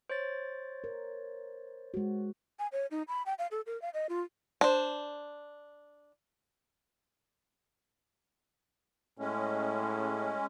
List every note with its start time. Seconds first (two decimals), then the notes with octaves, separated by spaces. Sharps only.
0.10 C5 C#5 A6
0.84 A#4
1.94 G#3 F#4
2.59 G#5
2.72 C#5
2.91 D#4
3.08 B5
3.26 G5
3.39 F5
3.51 A4
3.66 A#4
3.82 F5
3.94 D#5
4.09 F4
4.61 D4 C5
9.19 A2 G#3 C#4